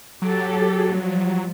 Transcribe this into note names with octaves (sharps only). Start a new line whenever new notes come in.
F#3 G4 A4
F3 G3